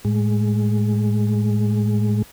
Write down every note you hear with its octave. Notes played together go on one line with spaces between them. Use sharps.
A2 G#3